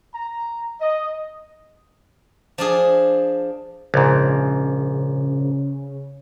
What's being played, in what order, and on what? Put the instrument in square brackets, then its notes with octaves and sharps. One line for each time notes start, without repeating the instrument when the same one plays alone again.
[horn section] A#5
D#5
[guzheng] F3 D4 G#4
[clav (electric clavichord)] A#1 G#2 [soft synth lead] C#3